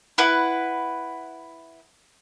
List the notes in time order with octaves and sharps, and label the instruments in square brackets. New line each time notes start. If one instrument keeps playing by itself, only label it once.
[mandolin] E4 B4 F#5